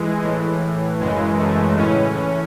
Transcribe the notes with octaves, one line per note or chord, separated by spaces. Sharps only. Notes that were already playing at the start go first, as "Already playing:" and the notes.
Already playing: E3 G#3
A2 E3
F#2 C#3 E3 G#3
A3
A2 E3 C#4